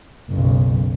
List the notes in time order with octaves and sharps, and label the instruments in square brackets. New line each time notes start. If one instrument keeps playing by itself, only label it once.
[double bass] F#1 B1